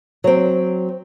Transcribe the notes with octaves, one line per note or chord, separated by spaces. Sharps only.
F#3 C4